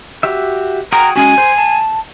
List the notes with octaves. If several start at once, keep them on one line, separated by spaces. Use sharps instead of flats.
F#4 G4 E5
F#4 G#4 G5 A#5
G#3 C#4 F#4 G#5
C5
A5